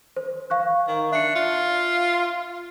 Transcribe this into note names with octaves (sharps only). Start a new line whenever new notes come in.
C5
F5 C#6 F#6
D#3
D4 E5 C#7
F4